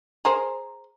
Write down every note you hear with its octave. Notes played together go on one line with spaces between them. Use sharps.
G#4 A#4 C5